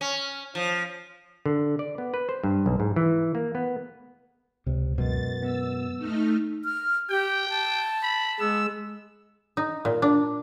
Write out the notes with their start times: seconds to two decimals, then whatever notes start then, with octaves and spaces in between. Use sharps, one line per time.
0.01 C#4
0.55 F3
1.46 D3
1.79 D5
1.98 B3
2.14 B4
2.29 C5
2.44 G2
2.66 B1
2.80 G#2
2.96 E3
3.35 A#3
3.55 B3
4.67 C#2 C3
4.98 F#2 B2 G#3 A6
5.43 B3 E6
5.98 A3 D#4 F6
6.65 F6
7.10 G4 G5
7.49 A5
8.03 B5
8.40 G#3 B3 E6
9.57 D#4
9.85 A#2
10.02 D4